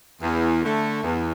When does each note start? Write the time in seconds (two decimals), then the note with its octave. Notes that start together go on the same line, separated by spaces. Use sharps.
0.22 E2
0.63 D3 A3
1.03 E2